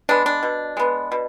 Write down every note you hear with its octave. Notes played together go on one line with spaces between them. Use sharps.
G#3 B3 D4
D4
B2
G#3 B3
B2